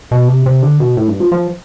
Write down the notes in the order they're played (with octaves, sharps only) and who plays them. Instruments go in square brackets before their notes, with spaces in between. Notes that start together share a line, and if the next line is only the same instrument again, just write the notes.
[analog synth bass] B2
C3
C3
D3
B2
A2
G2
F3
F3